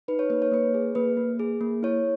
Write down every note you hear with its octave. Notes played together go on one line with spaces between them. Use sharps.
D#4 B4
C#5
A#3 B4
C#5
A#3 B4
G#4
A#3 B4
A#3
G#4
A#3
E4 C#5